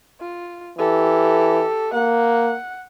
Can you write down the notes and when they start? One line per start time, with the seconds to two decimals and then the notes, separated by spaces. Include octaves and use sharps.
0.20 F4
0.78 E3 G4 A4
1.93 A#3 F#5